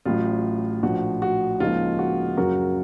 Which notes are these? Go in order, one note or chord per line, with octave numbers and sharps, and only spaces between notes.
A1 A2 F#3 F4
A#1 A2 F3 F#4
F#4
C#2 C#3 F3 A#3 D#4 F4
F#4
F#2 C#3 F#3 F#4 A#4